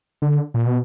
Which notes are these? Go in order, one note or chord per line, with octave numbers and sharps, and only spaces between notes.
D3
A#2
B2